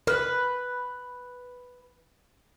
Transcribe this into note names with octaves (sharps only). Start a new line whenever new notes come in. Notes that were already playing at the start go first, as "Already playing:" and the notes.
A#4 B4 F6